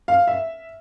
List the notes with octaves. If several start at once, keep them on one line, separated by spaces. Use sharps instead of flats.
F5
E5